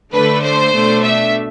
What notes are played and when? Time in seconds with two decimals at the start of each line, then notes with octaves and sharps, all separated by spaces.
0.14 D3 A3 D4 B4
0.43 C5
0.74 B2 A3 D4
1.04 E5